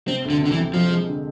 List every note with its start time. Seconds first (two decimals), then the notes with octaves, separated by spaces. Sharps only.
0.08 C3 C4
0.25 D2
0.30 D3
0.40 C3
0.45 D3
0.51 E3
0.57 C3
0.73 F2 F3
0.90 G#3
1.07 D3